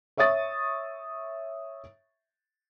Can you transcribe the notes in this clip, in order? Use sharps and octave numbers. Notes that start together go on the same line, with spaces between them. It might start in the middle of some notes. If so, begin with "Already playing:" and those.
C#5 E5 C#6 D#6 A6